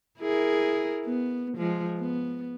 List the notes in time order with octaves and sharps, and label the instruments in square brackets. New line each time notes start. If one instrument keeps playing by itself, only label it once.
[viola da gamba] E4 G#4 A#4
B3
F3 G#3
B3